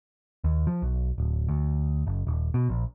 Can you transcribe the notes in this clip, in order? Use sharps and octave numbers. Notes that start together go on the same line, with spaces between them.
D#2
F3
B1
D1
D2
F#1
D#1
B2
A#1